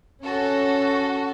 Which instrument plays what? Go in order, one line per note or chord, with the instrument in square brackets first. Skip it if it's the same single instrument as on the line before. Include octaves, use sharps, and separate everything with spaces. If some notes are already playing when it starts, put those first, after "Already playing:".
[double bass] C#4 [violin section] F#4 A4